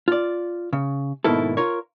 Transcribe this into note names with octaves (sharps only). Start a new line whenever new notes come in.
F4 D5
C#3
G#2 B2 D#3 A#3 E4 A4
F4 A#4 C#5